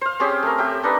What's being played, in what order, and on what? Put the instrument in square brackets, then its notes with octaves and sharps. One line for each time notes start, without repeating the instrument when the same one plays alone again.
[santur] C5 F5
C4 C#4 G4 G#4
A3 A#4
G4 E5 G5
D4 D#4 B4